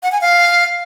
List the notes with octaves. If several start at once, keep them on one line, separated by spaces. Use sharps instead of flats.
F#5
G#5
F5